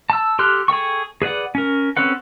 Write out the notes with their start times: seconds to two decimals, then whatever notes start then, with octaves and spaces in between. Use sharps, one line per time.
0.10 A5 E6
0.39 G4 A4 C6 F6 F#6
0.68 G#4 A4 G5 C#6
1.22 G#4 B4 D5 F#5
1.55 C#4 A#4
1.97 C4 C#4 A4 B4 F#5